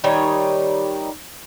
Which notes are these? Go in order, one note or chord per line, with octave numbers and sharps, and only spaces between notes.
D#3 G3 D#4 C#5